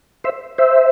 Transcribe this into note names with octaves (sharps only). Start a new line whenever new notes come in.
C5 E5
C5 E5